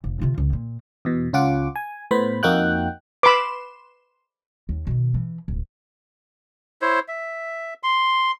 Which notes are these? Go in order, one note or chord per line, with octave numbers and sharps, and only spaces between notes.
F1
C3 F4
C#2
A#2
E2 B2
C#2 C#4 F4 F#5 D6
G#5
A2 B3 C5 B5
F2 A#3 D#4 F#4 G5 F#6
B4 B5 C6 D6 E7
D#2
B2 D#3
E3
D1
E4 C5 C#5
E5
C6